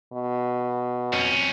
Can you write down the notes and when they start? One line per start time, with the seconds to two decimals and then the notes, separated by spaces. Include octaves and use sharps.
0.13 B2
1.13 F2 C#4